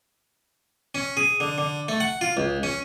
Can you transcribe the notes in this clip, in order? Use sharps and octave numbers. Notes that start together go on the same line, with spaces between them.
C#4
G#4
D3
D3
A3
F#5
F4
C#2
C#4